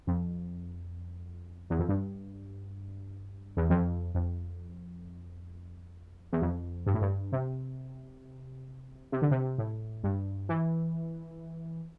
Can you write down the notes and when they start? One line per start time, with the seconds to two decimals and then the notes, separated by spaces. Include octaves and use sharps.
0.07 F2
1.70 E2
1.79 F2
1.89 G2
3.57 E2
3.70 F2
4.15 F2
6.32 E2
6.42 F2
6.86 G2
6.94 A2
7.02 G2
7.32 C3
9.12 C3
9.22 D3
9.31 C3
9.58 A2
10.04 G2
10.49 E3